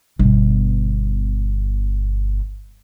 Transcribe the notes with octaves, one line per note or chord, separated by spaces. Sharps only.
G1 B2